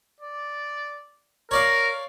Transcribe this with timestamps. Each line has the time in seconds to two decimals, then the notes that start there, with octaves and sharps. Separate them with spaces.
0.21 D5
1.51 A#4 C#5 D5 F5